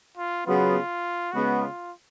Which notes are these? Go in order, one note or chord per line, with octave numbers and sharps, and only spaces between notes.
F4
C#3 F#3 B3 F4
C#3 G#3 B3 F#4
F4